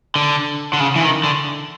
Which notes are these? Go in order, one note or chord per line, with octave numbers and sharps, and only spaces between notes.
D3
D3
C#3
E3
D#3
D3